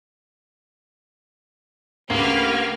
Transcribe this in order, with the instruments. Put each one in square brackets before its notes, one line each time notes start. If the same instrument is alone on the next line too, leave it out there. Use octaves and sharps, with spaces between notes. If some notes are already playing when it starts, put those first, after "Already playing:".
[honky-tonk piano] D2 C#3 [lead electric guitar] A#3 [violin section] G4 B4 F6